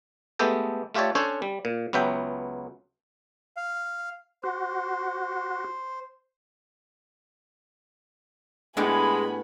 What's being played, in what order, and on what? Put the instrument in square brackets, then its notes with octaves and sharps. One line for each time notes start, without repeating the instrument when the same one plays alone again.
[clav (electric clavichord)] G#3 A3 B3 G4 A4 G5
A3 F4 G4 A4 C#5 D5
C#4 D4 A4 C5 C#5
G3
A#2
C#2 F#3 B3 E5 G5
[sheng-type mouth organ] F5
[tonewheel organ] F#4 [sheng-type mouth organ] C5
[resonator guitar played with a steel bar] A2 B3 [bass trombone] G#3 [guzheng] D4 G4 [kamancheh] G#5 B5